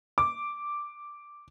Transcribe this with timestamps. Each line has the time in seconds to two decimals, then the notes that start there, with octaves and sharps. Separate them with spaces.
0.18 D6